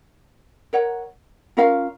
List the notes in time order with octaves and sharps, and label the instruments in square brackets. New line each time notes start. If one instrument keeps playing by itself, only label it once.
[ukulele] A#4 C#5 F#5
C#4 F4 A#4 F5